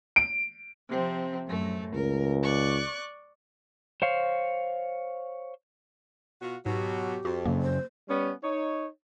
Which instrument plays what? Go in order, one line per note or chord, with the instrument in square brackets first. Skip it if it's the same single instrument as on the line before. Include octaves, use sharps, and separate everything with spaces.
[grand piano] D7
[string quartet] C3 F3 C4
F#2 A2 A3
[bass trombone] C#2 [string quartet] A#4
[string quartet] D5 C#6 F#6
[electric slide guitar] C5 C#5 F5
[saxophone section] B2 F4 F#4
[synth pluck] G#2 [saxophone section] B2 F#3 [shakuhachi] G4
[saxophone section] F2 [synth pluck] F#4
[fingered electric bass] F#2 C#3 [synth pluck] A#3
[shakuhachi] C5
[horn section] G3 B3 C#4
D#4 C#5